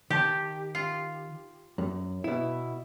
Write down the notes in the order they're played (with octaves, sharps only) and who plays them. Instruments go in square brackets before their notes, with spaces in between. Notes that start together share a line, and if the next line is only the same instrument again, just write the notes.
[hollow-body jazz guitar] D#3 A5 [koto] G4
[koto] F4
[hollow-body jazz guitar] F#2
B2 E4